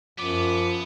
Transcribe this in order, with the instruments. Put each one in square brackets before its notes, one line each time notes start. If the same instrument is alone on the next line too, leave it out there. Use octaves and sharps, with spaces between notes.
[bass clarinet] F#2 [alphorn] F3 [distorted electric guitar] B3 [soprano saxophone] D6